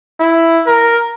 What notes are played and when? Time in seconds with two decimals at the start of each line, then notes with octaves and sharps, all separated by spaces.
0.20 E4
0.67 A#4